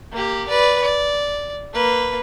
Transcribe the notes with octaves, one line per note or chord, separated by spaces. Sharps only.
A#3 G4
B4 D5
D5
A#3 B4